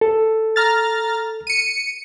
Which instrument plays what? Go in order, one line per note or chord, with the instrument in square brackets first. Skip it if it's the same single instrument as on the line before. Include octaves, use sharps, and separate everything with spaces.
[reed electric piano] A4
[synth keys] A#5 F6 A6
C#7 D#7